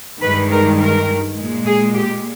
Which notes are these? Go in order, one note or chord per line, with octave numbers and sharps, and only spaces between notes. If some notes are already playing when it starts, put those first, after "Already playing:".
G2 D#3 G#3 B4
A#4
A#4
A#2 G#3
G#4
G4